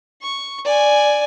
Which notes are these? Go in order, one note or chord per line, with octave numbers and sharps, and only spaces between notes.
C#6
D5 G#5